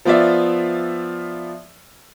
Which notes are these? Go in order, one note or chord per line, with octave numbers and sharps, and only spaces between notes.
F3 B3 F4 D5 E5